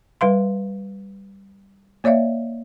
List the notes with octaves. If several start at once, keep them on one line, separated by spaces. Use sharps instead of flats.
G3 B4 F5 C6
A#3 C#5 D5 E5 F5